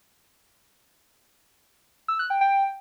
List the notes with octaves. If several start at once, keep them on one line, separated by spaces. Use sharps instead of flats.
E6
F#6
G5
G5